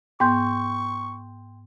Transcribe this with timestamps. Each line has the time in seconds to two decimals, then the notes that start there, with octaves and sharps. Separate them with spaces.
0.20 G#2 B3 G5 G#5 C6 C#6 G6